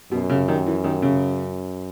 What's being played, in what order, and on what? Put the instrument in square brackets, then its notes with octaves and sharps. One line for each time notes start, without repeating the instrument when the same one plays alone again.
[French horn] F#2 [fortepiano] B2
[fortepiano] C#3
D#3
E3
D#3
C#3